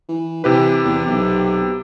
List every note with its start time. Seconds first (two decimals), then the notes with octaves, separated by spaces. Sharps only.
0.09 E3
0.44 C3 E3 G4 B4
0.84 E2
1.06 B1